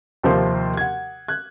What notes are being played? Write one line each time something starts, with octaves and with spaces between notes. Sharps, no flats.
D#2 C3 F3 A#3 C4 C5
F#5 G#6
F#6 G#6